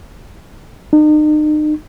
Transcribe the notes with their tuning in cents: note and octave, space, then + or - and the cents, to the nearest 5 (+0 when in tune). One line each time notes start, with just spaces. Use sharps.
D#4 -40